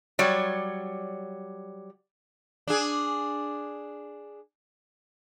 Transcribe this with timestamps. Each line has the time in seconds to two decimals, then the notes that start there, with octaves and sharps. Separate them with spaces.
0.19 F#3 G3 C#5 D5
2.68 D4 G#4